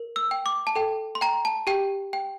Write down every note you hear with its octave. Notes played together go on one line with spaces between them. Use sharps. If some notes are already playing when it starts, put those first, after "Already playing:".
Already playing: A#4
E6
G5
D6
A5
A4 G5
C6
G5 A#5
A5
G4 G5
G5